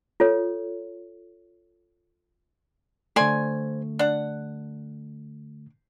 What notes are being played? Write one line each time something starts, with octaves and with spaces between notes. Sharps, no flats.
F4 A4 C#5
D3 A3 C5 D5 G#5
D4 F#5